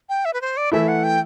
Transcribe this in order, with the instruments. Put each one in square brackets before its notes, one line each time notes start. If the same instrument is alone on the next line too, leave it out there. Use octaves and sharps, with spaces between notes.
[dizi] G5
E5
B4
C5
D5
[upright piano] E3 A3 E4 [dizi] E5
[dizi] F#5
G5